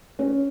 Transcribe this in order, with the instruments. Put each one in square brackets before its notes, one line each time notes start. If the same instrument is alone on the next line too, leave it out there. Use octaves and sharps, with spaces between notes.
[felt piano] C#4